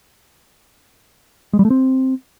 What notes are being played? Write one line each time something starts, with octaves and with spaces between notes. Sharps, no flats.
G#3
G3
A3
C4